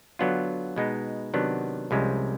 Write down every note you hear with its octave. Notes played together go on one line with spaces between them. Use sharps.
D3 F#3 B3 D4 F4
B2 G#3 B3 D#4
C3 D#3 F#3 B3 D4
C2 C3 F3 G#3 C#4